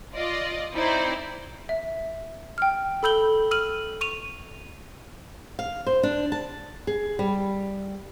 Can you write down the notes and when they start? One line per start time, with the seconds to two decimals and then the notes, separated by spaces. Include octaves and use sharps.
0.15 F4 D5 D#5
0.74 C4 D#4 E4 C5 D5
1.69 E5
2.58 G5 F6
3.03 A4 B5 E6 G6 F#7 G7
3.51 E6 F6 D#7 F#7
4.01 C#6 D#7 F7
5.59 F5
5.87 C5
6.03 D4
6.32 A5
6.87 G#4
7.19 G3